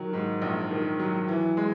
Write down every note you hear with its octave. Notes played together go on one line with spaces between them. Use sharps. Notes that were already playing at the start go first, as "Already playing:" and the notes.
Already playing: D#3 F#3
G#2
A#1
D#3
F#3
E3
G#3